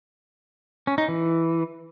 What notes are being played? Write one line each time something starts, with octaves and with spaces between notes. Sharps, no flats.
C#4
D#4
E3